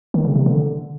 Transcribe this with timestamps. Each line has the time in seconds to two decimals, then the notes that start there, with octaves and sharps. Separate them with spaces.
0.14 D#3
0.25 C#3
0.35 C3
0.46 D3